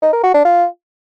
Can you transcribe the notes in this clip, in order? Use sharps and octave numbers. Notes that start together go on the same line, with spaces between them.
D#4
A#4
F#4
D4
F4